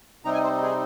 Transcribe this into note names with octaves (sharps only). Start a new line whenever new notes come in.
C3 G3 C4 D#4 A#5
G#5
C5
G#4